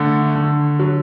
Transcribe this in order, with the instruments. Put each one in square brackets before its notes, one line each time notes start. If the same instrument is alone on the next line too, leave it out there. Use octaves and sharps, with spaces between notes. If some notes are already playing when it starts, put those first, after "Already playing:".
Already playing: [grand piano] D3 A3
D3
F#3